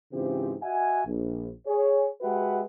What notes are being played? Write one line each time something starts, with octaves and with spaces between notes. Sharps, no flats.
G#2 C#3 E3 C4 F4 G4
F#4 D#5 E5 F#5 G#5
A#1
G#4 C#5
G#3 F#4 G4 B4 E5 F#5